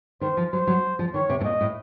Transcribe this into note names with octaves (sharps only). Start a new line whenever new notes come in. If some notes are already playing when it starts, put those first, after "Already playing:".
D#3 C5
F3
F#3 C5
F#3
F3
D#3 C#5
C3
A2
A#2 D#5
A2